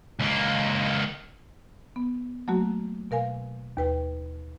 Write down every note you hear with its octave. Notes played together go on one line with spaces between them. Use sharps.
C#2 A#3
B3
F#3 A3 A#3 F#4
B2 A#4 F5 G#5
D#2 B4 G5